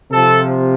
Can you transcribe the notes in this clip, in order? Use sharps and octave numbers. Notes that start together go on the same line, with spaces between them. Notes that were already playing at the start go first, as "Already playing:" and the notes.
C3 F3 A4